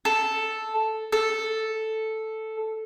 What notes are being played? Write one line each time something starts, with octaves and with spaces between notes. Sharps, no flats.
A4
A4